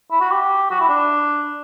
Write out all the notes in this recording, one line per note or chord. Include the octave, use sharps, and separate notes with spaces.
E4
F#4
G4
F#4
E4
D4